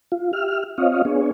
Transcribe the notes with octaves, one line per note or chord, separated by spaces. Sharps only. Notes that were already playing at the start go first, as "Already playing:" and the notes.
F4
G4 E5 F6
C4 F4 C#5 D#5 F5
B3 D4 G#4 C#5